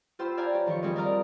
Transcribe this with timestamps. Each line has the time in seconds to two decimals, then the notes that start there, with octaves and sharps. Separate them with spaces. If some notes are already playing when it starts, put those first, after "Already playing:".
0.19 F4 G4 C5 G5 B5 E6
0.37 D5 F5 G5 G#5 A#5
0.53 G4 C#5
0.66 F2 D#3 F4 A#4 C#6
0.83 G3 C4 G#4 C#5 D#5 D#6
0.96 A#4 D5 D#5 F5 A#5